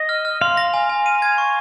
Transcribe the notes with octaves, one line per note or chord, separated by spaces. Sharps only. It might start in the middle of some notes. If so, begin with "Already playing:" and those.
Already playing: D#5
F6
F6
F5 C6
A#6
G#5
G#5
D#7
G#6
C#6